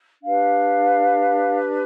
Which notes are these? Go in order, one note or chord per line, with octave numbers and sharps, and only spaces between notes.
D4 G4 B4 F5